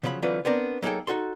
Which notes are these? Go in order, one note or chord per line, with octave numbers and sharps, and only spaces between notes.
C#3 F3 F#3 D5 B5
D3 E3 F#3 C4 F4 B4
B3 C4 D4 A#4
F#3 A#3 D#4 G#4 A4 G5
D#4 F#4 A4 C6